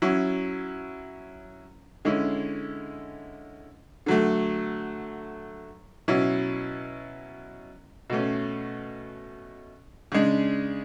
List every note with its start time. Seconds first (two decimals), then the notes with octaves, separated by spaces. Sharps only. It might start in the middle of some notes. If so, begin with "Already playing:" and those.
0.02 F#3 C#4 E4
2.05 D3 G#3 C#4 E4
4.06 D3 F#3 A3
6.08 B2 F#3 C#4 E4
8.10 B2 A3 C#4
10.12 C#3 G#3 D4